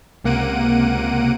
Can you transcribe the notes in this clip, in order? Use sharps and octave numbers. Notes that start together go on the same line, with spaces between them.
C#2 C3 A#3 F#5 D7 D#7